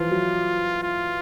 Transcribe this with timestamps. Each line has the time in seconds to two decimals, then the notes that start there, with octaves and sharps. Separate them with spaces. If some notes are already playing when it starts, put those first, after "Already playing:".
Already playing: E3 F3 F4
0.11 F#3
0.83 F4